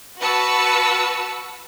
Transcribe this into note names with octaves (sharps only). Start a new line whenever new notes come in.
F#4 B4 A5 E6 C#7